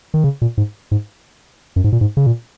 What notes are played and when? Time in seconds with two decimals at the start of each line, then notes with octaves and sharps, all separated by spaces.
0.14 D#3
0.24 C#3
0.42 A#2
0.57 G#2
0.91 G#2
1.76 F#2
1.84 G#2
1.92 A#2
2.01 G#2
2.17 C#3
2.27 A#2